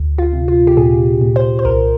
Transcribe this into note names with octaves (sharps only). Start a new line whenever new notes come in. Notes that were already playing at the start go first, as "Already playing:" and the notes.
Already playing: D2
F4
C3
F4
G4
A#2 G#4
A#2
C5
C5
C2 A#4